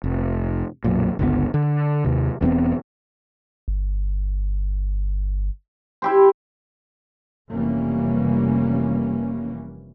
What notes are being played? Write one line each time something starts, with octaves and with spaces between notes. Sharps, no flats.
F1
B1 F#2 A#2
G1 C#2 C3 B3
D3
D#2 C3
E1 E2 B3 C4
G1
E4 G4 C5
F1 E3 G3 A#3 C#4